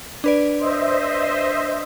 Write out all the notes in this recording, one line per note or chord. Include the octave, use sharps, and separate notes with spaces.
D4 B4 D5
C5 D#5 E5